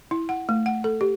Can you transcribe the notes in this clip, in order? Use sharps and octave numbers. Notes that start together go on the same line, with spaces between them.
E4
F#5
A3
F#5
A4
G4